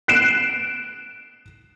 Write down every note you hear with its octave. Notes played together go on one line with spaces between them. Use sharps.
F#6 C7 D7 E7